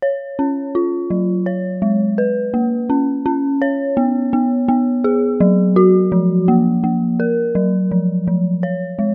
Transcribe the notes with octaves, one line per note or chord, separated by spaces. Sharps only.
C#5
C#4
F4
F#3
C#5
G#3
B4
A#3
C#4
C#4
C#5
B3
B3
B3
G#4
F#3
F#4
F3
A#3
A#3
A#4
F#3
F3
F3
C#5
G#3